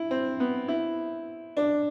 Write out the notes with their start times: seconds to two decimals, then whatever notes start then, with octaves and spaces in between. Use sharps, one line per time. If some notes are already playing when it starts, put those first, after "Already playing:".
Already playing: E4
0.11 C4
0.40 B3
0.68 E4
1.57 D4